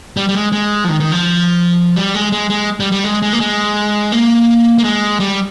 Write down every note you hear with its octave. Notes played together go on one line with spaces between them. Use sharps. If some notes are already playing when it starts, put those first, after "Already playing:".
G3
G3
G#3
G#3
F3
D#3
D#3
F3
G3
G#3
G#3
G#3
G3
G3
G#3
G#3
A#3
G#3
A#3
A#3
G#3
G3